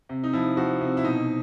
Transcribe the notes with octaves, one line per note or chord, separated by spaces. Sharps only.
C3
D#4
F3 E4
F3 F#4
C3
E4
B2 D#4